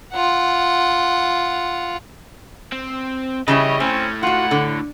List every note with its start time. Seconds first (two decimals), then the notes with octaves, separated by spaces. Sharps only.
0.13 F4 F#5
2.72 C4
3.48 E2 C#3 G3 E4 C#5 D#5
3.80 A2 C4 C#4
4.23 F4 F#4 F#5
4.51 D3